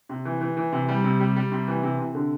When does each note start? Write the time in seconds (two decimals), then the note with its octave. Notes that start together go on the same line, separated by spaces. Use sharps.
0.09 C3
0.25 E3
0.41 E3
0.57 E3
0.72 C3
0.88 G3
1.04 C3
1.20 G3
1.36 G3
1.52 C3
1.68 E3
1.83 C3
1.99 C3
2.15 D3